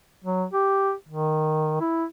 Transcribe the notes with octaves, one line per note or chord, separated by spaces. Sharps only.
F#3
G4
D#3
E4